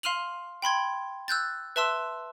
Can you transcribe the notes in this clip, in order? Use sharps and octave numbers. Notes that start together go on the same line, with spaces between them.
F5 C6 F6 D#7 F7 F#7
G5 B5 C6 G#6
E6 F#6 G6 A6
B4 E5 A5 C6 E6